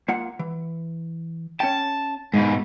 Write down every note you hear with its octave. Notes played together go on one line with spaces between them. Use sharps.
A#3 F4 F#5
E3
C#4 G5 A5
G#2 B2 G#3